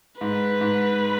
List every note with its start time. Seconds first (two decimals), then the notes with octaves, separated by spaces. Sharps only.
0.21 G#2 B4
0.61 G#2